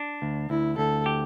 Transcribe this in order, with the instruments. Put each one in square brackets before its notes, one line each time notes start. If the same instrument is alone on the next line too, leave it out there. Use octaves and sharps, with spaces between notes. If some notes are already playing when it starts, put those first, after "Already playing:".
Already playing: [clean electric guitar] D4
D2
[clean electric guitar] D2 [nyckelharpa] E4
[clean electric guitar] D2 [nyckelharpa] A4
[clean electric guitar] G4